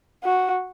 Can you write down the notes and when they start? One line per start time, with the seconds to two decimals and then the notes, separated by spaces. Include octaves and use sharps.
0.24 F#4